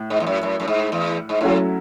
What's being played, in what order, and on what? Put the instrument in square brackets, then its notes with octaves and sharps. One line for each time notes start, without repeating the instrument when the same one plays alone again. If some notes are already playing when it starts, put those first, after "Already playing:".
Already playing: [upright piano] A2
[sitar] G#2
E2
F#2
F#2
F#2
G#2
E2
G#2
[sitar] A2 [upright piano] F#3 A3 C#4 E4